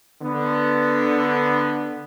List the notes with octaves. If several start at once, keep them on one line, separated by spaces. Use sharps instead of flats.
D3 B3